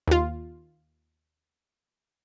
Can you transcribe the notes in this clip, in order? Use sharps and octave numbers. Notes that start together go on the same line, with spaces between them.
D#2 F4